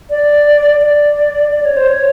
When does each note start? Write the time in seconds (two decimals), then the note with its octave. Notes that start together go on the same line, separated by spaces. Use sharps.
0.10 D5
0.81 D5
1.52 D5
1.65 C#5
1.77 C5
1.88 C#5